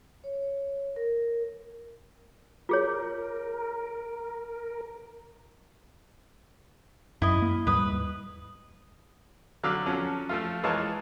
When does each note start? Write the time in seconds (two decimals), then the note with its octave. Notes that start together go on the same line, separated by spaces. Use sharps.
0.24 C#5
0.96 A#4
2.69 F4 G#4 A#4 C#5
7.22 F#2 E4 D#5
7.42 A#3
7.67 D#2 G#2 G3 B4 D#6
9.63 D3 F#3 F5 D6 E6
9.86 F3 F#3 C#4 A4
10.29 F3 A3 F4
10.63 E3 G#3 A#3 F4 C#5 A5